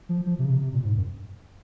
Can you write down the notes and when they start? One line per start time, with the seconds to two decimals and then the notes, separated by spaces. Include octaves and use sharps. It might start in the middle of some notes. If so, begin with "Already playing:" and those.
0.09 F3
0.27 F3
0.39 C3
0.45 C#3
0.50 C3
0.62 C3
0.73 A#2
0.85 G#2
0.97 F#2